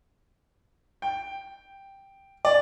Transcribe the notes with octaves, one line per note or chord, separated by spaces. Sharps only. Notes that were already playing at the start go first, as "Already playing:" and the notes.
G5
D5